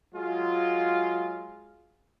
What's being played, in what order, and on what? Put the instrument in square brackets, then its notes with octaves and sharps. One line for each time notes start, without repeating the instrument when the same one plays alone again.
[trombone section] F#3 G#3 F4